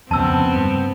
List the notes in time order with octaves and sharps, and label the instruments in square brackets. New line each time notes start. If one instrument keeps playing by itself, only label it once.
[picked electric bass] F2 C#3 [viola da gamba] B3 C4 [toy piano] A5 E6
[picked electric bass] G2